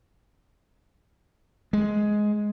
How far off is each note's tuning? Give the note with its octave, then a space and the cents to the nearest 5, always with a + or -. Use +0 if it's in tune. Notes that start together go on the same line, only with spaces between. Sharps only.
G#3 +10